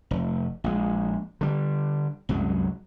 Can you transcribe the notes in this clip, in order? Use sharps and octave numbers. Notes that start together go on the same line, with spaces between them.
F1
A#1 G#3
D3 G3
C2 F#2 F#3 G#3